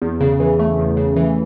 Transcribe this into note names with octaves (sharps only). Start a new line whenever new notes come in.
E2
C#3
E3
A3
E2
C#3
E3